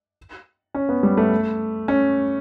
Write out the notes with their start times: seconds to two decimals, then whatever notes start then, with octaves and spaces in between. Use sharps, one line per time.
0.74 C#4
0.89 B3
1.03 G3
1.17 A3
1.88 C#4